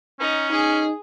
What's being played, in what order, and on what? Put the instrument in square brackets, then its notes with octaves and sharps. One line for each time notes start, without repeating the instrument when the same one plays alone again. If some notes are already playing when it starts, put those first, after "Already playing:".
[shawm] C#4 [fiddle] D#4
[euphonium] D#4 [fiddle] G#4